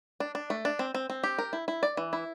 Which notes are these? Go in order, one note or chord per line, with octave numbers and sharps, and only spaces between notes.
D4
D4
A3
D4
C4
C4
C4
G4
A#4
E4
E4
D5
E3
E4